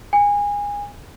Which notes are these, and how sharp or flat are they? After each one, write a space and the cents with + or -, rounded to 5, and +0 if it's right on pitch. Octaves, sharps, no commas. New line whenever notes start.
G#5 -25